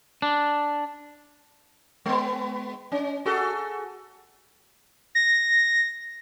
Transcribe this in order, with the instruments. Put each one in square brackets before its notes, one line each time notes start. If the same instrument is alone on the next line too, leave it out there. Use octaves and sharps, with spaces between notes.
[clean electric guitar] D4
[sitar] G#3 B3
C#4
F#4 G#4 A4
[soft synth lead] A#6